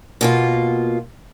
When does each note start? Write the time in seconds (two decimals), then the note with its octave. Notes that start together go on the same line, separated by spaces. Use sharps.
0.21 B2 A#3 F4